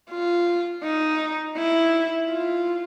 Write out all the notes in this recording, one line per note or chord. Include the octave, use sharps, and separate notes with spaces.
F4
D#4
E4
F4